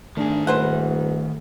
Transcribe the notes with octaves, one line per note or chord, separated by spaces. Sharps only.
D#3 A3 D4 G#4
D#1 A3 B4 C5 F#5